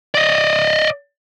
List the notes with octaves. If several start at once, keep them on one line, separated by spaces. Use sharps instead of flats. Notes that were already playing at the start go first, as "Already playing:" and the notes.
D5 D#5